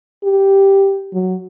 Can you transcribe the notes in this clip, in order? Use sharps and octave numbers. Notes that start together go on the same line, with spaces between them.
G4
F#3